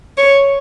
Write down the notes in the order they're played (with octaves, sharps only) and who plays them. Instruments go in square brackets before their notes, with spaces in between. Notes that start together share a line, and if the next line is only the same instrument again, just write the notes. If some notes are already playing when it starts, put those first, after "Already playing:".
[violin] C#5